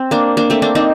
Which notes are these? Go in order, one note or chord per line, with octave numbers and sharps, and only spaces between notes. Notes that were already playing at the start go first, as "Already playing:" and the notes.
Already playing: C4
A#3 D4
A#3 D4
A3 C4
A#3 D4
C4 D#4